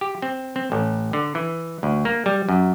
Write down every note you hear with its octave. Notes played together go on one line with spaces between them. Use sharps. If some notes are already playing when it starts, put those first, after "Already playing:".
G4
C4
C4
A1
D3
E3
D2
A#3
G3
F#2